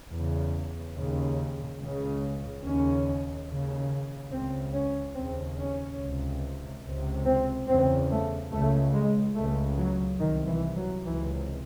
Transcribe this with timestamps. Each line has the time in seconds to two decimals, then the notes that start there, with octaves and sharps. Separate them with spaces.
0.11 E2 C#3
0.95 D#2 C#3
1.79 C#2 C#3
2.64 D#2 C#3 C#4
3.48 D#2 C#3
4.31 C#2 C#3 C4
4.73 C#4
5.15 D#2 C#3 C4
5.58 C#4
5.99 C#2 C3
6.84 C#2 C3
7.25 C4
7.68 E2 C#3 C4
8.10 A3
8.52 C#2 C#3 A3
8.94 G#3
9.36 C#2 C#3 A3
9.78 F#3
10.20 C2 C3 D#3
10.48 E3
10.76 F#3
11.04 C#2 C3 E3